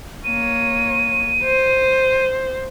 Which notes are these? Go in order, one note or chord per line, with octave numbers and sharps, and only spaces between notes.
A#3 C#5 D#7
C5